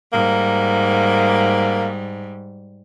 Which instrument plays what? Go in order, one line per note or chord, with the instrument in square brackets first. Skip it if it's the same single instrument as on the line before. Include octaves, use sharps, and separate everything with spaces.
[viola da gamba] G#2 G3 [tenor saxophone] A#3